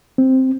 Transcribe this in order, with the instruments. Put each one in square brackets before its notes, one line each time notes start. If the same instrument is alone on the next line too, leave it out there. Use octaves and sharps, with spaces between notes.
[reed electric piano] C4